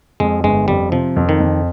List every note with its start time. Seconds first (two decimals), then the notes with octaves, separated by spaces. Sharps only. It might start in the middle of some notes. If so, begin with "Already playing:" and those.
0.20 F2 G#3
0.44 G1 G#3
0.68 F2 G3
0.92 C3 F3
1.16 F2
1.29 D#3
1.40 F2